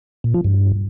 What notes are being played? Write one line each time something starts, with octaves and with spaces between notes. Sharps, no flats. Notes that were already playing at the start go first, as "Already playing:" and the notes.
A#2
F3
G2